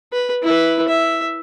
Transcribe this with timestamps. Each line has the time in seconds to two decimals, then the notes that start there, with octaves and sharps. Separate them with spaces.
0.13 B4
0.43 E4 B4
0.88 E5